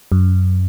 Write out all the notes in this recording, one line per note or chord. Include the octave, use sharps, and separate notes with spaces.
F#2